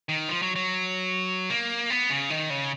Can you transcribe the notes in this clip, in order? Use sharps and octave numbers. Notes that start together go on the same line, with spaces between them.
D#3
F3
F#3
F#3
A#3
B3
C#3
D#3
C#3